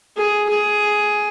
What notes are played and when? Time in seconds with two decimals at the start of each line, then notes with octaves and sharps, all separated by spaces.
0.16 G#4
0.49 G#4